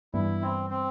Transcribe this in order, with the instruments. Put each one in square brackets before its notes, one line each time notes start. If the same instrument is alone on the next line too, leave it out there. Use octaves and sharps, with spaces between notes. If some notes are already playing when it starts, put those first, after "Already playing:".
[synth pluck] G2 E3 G3 B3 [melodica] E4
[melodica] C4
C4